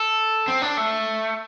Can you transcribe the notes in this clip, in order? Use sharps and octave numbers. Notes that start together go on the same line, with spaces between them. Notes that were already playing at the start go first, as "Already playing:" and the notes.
Already playing: A4
C4
D4
A3